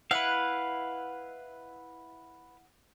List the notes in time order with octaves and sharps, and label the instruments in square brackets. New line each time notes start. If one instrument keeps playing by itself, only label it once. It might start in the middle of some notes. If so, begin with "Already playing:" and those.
[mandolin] E4 F#5 F#6 [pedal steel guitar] B4 F5